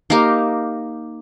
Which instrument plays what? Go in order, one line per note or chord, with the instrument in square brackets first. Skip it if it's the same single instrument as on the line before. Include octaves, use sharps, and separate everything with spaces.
[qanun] A#3 D#4 G4 A#4